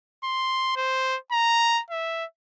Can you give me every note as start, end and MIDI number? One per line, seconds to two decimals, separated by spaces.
0.24 0.71 84
0.76 1.17 72
1.32 1.81 82
1.91 2.25 76